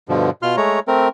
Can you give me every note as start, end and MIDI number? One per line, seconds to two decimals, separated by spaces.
0.09 0.30 43
0.09 0.30 47
0.09 0.30 50
0.09 0.30 53
0.42 0.56 47
0.42 0.56 65
0.42 0.56 84
0.42 0.56 89
0.57 0.80 56
0.57 0.80 57
0.57 0.80 73
0.57 0.80 82
0.88 1.08 57
0.88 1.08 60
0.88 1.08 70